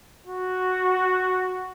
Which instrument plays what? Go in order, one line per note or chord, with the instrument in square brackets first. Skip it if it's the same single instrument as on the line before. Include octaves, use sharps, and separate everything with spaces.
[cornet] F#4